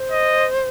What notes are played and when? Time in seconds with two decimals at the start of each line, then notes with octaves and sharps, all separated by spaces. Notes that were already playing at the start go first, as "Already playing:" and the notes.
Already playing: C5
0.11 D#5